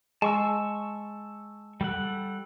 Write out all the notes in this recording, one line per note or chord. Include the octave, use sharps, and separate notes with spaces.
G#3 A5 C#6 E6
G3 A4 F#5